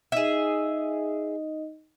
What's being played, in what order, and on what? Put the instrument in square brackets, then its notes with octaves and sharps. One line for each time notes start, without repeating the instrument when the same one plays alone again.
[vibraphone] D#4 D#5 [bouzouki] G#4 E5